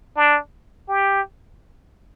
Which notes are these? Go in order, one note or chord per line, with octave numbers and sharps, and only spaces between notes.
D4
G4